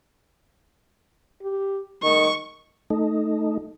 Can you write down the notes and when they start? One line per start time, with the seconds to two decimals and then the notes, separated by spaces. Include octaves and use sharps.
1.42 G4
2.03 D#3 C#6
2.90 A3 D#4